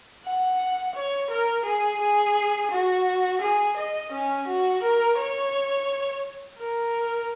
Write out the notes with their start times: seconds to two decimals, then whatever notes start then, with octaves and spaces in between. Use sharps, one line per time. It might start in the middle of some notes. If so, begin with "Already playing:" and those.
0.25 F#5
0.95 C#5
1.30 A#4
1.65 G#4
2.01 G#4
2.71 F#4
3.41 G#4
3.77 D#5
4.12 C#4
4.47 F#4
4.83 A#4
5.18 C#5
6.59 A#4